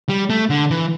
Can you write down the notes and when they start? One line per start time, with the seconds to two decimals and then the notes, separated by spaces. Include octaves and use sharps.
0.09 G3
0.30 A3
0.50 D3
0.71 E3